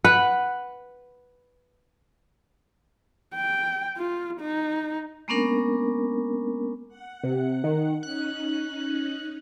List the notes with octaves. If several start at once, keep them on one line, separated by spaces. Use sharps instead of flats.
B4 F#5
G5
F4
D#4
G#3 A#3 B3 C#4 D4 A#4
F#5
C3
D#3
C#4 D#4 F#6